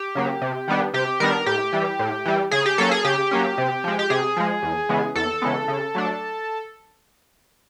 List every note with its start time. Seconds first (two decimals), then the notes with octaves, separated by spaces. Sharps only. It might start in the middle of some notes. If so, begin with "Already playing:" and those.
Already playing: G4
0.15 C#3 F#3 A#3
0.41 C3
0.68 D#3 G3 B3 D4
0.94 C3 G4
1.20 D#3 G3 B3 D4 A#4
1.46 A2 G4
1.73 E3 G3
1.99 A2
2.25 E3 G3
2.51 C#3 G#4
2.66 G4
2.78 F#3 A#3 C#4 A4
2.91 G#4
3.04 C#3 G4
3.31 F#3 A#3 C#4
3.58 C3
3.84 F3 G#3
3.99 G4
4.10 C3 G#4
4.37 F3 G#3
4.62 E2
4.89 C#3 E3 G#3 B3
5.15 E2 A4
5.42 C#3 E3 G#3 B3
5.68 C#3
5.95 F#3 A3 D4